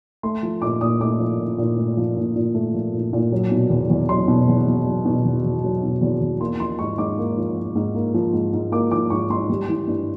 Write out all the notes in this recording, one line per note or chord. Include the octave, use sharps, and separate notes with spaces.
A3 C6
F3
A#2 D6
A#2 D#6
A3 D6
F3
A#2
A#2
A3
F3
A#2
A#2
A3
F3
A#2
A#2
F#3
B2
E2
E2
F#3 C6
B2
E2
E2
F#3
B2
E2
E2
F#3
B2
E2
E2
A#3 C6
F3 C6
G#2 C#6
G#2 D6
A#3
F3
G#2
G#2
A#3
F3
G#2
G#2
A#3 D6
F3 D6
G#2 C#6
G#2 C6
G3
E3
G2